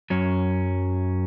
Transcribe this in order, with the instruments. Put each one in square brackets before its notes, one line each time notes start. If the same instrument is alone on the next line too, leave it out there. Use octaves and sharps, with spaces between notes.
[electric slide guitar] F#2 F#3 C#4